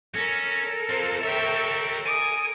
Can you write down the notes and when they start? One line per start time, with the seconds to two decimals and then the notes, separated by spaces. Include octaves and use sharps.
0.15 C#4 A4 A#4 A#6
0.89 C4 F4 C5
1.23 G4 C#5 E5 G5
2.05 G#5 D#6 D7